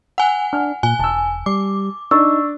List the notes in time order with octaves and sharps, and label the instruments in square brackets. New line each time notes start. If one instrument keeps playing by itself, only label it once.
[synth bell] F#5 G#5
[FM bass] D4 [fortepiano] F6
[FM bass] A#2 [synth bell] G#5
[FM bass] E1 [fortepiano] A5 E6
[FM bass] G3 [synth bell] D6
[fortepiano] D4 [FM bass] D#4 [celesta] C#6 E6